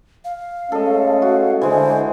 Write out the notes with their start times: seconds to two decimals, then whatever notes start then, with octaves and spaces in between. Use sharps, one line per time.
0.25 F5
0.72 G#3 A3 C#4 A4 D#5
1.22 F#4
1.62 D3 E3 G#3 C5